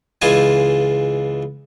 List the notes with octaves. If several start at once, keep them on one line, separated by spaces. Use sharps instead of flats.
C#2 E3 G#3 F4 G#5 A5